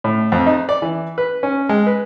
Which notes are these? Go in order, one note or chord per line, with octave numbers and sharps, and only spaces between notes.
A2
F2
D#4
D5
E3
B4
C#4
G#3
B4